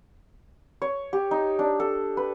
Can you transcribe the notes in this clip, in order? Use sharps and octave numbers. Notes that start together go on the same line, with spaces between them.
C#5
G4
D#4
D4
A4
B4